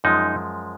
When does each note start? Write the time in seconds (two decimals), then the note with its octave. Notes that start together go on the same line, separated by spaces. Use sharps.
0.04 F#2 F3 G#3 D#4